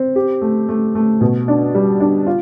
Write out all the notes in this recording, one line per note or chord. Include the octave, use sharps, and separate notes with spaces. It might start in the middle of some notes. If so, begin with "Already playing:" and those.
Already playing: C4
G4
A3
A3
A3
B2
D4
G3
D4
F4